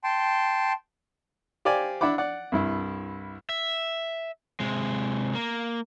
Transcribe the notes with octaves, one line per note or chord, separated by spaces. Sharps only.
G5 A5 C6
G4 C5 D5 F5 G#5
D4 E4 F#5 B5 D6
D5 F#5
C2 G2 E4
E5
C3 G#3
A#3